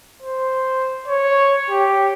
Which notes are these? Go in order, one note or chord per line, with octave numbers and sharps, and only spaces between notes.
C5
C#5
G4